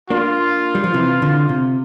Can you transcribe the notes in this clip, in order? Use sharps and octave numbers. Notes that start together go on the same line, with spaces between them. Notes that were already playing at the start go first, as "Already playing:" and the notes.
A#3 D4 F4
G3
F3
C3 E3
D3
C3